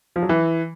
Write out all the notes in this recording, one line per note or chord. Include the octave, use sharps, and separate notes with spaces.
F3
F#3
E3